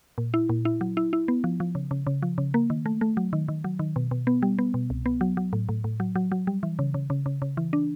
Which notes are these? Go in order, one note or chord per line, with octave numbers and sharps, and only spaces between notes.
A#2
E4
A#2
E4
F#3
E4
E4
B3
F3
F3
C#3
C#3
C#3
F3
C#3
A#3
D#3
A3
A3
F#3
D#3
D#3
F#3
D#3
B2
B2
B3
G3
B3
B2
C2
B3
F#3
F#3
A2
A2
A2
F#3
F#3
F#3
G3
E3
C#3
C#3
C#3
C#3
C#3
E3
D4